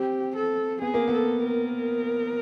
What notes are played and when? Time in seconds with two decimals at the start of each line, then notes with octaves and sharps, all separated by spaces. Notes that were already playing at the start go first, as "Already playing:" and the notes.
Already playing: C4 G4
0.36 A4
0.82 B3 G#4
0.94 A#3
1.08 B3 A4
1.43 A#4